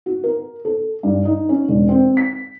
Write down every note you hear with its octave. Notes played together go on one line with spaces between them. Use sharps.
F#4
A#4
A4
G2
D#4
C#4
E1
C4
B6